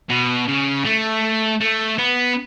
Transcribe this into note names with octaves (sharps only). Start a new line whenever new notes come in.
B2
C#3
A3
A3
B3